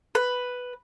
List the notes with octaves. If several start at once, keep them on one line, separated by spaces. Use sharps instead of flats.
B4